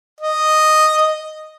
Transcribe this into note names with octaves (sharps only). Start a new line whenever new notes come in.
D#5